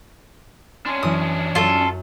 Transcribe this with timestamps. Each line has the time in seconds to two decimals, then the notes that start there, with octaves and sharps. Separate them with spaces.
0.86 C#4 D4 G#5 C6
1.03 F#2 E3 D#6
1.55 F#2 F4 A4